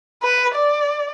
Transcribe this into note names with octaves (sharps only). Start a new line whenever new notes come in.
B4
D5